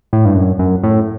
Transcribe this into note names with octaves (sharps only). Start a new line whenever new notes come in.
A2
G2
F#2
F#2
A2